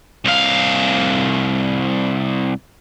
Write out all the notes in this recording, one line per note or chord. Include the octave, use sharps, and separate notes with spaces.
C2 F5